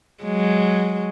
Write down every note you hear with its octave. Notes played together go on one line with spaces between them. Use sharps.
F#3 G#3